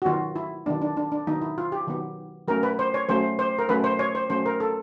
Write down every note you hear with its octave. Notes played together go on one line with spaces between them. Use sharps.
F#4
D#3 F#3 B3 F4
E4
D#3 F#3 B3 D4
D4
D4
D4
D#3 F#3 B3 D#4
E4
F4
G4
D#3 F#3 B3
F#3 A3 C#4 A#4
B4
C5
C#5
F#3 A3 C#4 C5
C5
A#4
F#3 A3 C#4 B4
C5
C#5
C5
F#3 A3 C#4 C5
A#4
A4